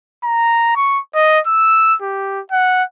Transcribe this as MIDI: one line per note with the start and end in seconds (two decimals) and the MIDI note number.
0.24 0.76 82
0.76 1.00 85
1.15 1.40 75
1.47 1.96 88
2.02 2.41 67
2.52 2.84 78